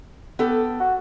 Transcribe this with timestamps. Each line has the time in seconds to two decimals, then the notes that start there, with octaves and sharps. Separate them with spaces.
0.39 B3 G4 A4
0.80 F#4